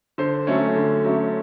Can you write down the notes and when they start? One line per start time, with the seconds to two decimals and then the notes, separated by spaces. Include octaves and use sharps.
0.18 D3 C5
0.47 F#3 A3 C#4
0.75 D3
1.04 F#3 A3 C#4